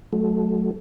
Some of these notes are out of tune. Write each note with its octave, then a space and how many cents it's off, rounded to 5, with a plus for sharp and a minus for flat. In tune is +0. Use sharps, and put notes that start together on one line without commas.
F#3 +0 A3 -20